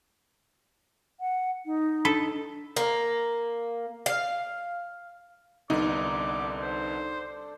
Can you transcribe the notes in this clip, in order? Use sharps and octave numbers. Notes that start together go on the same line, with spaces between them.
F#5
D#4
D4 A4
A#3
F5
C2 D3 B3 D4 D#4 A4 D5 D6
C5